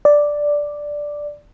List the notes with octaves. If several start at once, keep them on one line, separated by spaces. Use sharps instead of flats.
D5